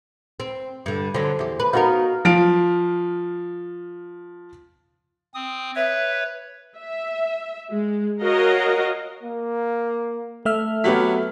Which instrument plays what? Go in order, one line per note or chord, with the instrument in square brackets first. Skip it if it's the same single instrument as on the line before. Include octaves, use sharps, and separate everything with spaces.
[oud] C4
G2 D3
[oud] D3 F#3 [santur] A4 C5
[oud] E2 G4
B4
[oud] B3 D#4 A#4 [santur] F#4 D#5 F5
[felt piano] F3 F5 D7
[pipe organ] C4 D#6
[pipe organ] B4 C#5 [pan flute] E5
[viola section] E5
G#3
F#4 A#4 C#5 D#5 F5 F#5
[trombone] A#3
[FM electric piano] A3 E5 F6 [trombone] A4
[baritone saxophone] F#3 [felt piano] B3 G4 B6